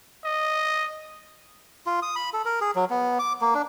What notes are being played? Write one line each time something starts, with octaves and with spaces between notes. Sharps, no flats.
D#5
F4
D#6
B5
A4
A#4
G#4
F#3
B3
D6
A#3
D4